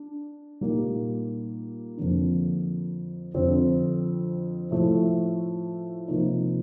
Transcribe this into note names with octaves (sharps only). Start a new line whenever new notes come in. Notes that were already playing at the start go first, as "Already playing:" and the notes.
Already playing: D4
A#2 G3 A#3 D#4 G4
F2 D3 F3 A#3 D4
F2 D3 F3 C4
A2 F3 A3
C3 F3 A#3 D#4